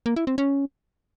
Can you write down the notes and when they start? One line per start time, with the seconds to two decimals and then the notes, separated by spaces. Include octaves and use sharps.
0.06 A#3
0.16 E4
0.27 C4
0.38 C#4